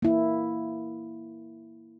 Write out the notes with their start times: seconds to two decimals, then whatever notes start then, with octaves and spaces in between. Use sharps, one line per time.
0.02 A#3 E4